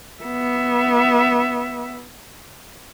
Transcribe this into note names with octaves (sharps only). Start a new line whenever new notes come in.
B3 E5